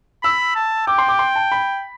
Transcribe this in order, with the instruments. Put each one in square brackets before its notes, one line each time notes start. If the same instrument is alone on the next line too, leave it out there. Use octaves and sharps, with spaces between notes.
[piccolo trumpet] B5 [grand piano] E6
[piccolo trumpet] A5
[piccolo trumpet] G5 [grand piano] D6
[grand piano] C6
D6
C6
A5
B5